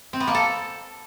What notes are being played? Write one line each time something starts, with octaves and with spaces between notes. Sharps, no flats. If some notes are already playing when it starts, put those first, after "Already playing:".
C4
B3
A#3
A4